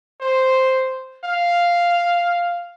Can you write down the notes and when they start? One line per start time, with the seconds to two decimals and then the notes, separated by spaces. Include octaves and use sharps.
0.21 C5
1.24 F5